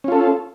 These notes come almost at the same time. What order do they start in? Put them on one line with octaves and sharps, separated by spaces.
C#4 F4 A4